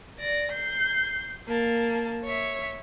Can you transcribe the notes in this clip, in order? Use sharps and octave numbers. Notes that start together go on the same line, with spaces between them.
D5 A#6
G6 C7
A#3 A5
C#5 E5